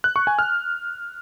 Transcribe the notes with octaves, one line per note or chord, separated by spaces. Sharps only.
F#6
C#6
G#5
F6